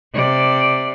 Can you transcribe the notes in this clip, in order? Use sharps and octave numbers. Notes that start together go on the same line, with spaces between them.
C3 D5